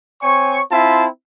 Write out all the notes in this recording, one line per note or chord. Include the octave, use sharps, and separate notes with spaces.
C4 C#5 G#5 C#6
C4 E4 F4 E5 A5 C6